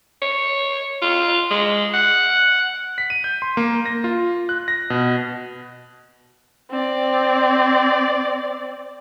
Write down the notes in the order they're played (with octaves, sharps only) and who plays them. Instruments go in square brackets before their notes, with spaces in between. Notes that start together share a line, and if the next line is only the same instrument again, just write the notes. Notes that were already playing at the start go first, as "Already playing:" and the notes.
[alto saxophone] C#5
F4
G#3
F#5
[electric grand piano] B6
D#7
G6
C6
A#3
A#6
F4
F#6
A#6
B2
[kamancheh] C4 D5